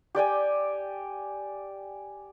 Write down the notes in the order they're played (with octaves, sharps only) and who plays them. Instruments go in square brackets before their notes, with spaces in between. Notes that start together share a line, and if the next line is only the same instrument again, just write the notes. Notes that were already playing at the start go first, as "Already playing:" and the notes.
[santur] G4 D5 G5 G#5